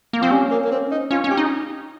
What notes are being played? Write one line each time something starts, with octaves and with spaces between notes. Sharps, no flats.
A#3
F3 C4
G3 C#4
A#3
A#3
C4
D#4
C#4 F4
C#4
G4
D#4